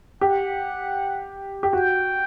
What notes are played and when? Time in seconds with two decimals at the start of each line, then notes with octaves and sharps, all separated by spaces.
0.21 G4 F#5
1.63 G4
1.73 F#4 G5